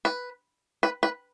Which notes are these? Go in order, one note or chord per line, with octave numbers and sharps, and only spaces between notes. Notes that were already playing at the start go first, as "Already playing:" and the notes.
B4
B4
B4